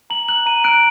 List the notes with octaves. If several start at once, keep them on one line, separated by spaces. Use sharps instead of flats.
A#5 F#7
F#6 F#7
A#5 D#7
F#6 D7